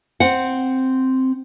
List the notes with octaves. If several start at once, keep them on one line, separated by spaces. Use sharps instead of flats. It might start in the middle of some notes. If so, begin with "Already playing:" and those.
C4 F#5